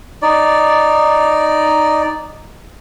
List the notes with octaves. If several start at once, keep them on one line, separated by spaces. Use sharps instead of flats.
D#4 D5